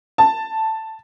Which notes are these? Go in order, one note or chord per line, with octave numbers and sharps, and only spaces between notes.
A5